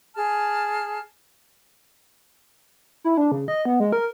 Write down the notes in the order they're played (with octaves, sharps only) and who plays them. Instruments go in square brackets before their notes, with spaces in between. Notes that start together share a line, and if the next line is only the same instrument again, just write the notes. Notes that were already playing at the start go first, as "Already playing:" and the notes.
[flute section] G#4 A5 F6
[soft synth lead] E4
D4
C#3
D#5
B3
G#3
A#4